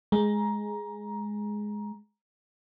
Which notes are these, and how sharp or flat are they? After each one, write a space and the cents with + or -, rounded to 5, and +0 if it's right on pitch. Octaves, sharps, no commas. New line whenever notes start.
G#3 +5 A#5 +15